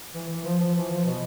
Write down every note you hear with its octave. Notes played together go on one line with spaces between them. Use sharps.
E3
E3
F3
F3
E3
F3
B2